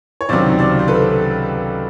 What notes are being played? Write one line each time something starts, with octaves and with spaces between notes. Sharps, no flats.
C#5
C#2 C3 D#3 F#3 C5 D5
C5 D5
C5
A4 B4